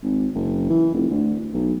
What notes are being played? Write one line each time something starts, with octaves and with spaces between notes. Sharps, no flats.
G#1
F#1
E3
F1
D2
B1